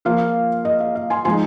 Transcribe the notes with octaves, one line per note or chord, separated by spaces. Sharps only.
F3 A#3 F4 F5
D#5
F5
F5
G#5 C6
F3 G#3 D#4 G#5 C6